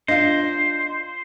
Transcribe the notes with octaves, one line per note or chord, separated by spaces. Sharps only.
D4 F4 C5 D#5 F5